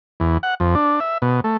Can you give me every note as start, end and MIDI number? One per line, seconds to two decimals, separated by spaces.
0.20 0.38 40
0.43 0.55 78
0.60 0.75 41
0.75 1.00 62
1.00 1.18 76
1.22 1.41 47
1.44 1.57 57